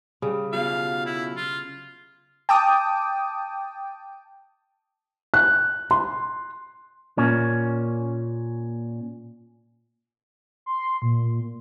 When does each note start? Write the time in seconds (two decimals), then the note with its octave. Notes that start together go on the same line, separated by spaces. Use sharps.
0.22 C#3 G3
0.53 B2 F#3 F4 F5
1.06 E4
1.37 F4
2.49 G5 A5 D6 D#6
5.34 F#6
5.91 C6
7.18 A#2 C#4
10.66 C6
11.02 A#2